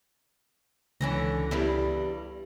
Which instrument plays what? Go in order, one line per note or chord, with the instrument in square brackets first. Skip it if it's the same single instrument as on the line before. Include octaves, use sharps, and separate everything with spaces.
[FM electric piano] C#2 A#6 [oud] D3 E3 C#4
[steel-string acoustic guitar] E2 G2 G3 [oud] E4